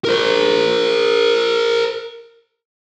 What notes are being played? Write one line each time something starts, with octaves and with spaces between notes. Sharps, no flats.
A#4 C5